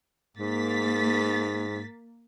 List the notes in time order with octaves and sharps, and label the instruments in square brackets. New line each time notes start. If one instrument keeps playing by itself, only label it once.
[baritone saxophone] G#2 [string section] A#3 A6 B6